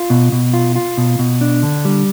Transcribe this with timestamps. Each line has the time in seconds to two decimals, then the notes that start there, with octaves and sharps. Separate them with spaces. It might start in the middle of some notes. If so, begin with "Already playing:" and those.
Already playing: F4
0.10 B2
0.32 B2
0.53 F4
0.76 F4
0.98 B2
1.19 B2
1.41 D4
1.63 D3
1.85 G3